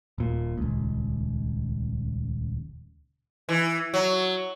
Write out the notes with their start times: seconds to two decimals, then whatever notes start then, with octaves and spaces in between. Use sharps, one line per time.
0.18 D#1 A#2
0.57 D#1 C#2
3.49 E3
3.94 F#3